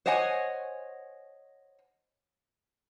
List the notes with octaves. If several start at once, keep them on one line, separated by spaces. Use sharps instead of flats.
C5 C#5 D#5 F#5 G#5